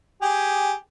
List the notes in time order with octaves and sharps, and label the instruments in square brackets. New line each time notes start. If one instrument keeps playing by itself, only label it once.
[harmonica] G4 G#4